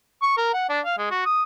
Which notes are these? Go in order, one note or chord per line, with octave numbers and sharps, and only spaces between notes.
C#6
A#4
F#5
D4
F5
G#3
F#4
D#6